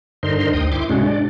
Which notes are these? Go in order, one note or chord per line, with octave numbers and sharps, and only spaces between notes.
G2 D3 D#4 A#4 C5 C6
D2 G5 D#6
E4 C6 D6
G#2 C3 G#3 C#4 D4 F#4
D4 D5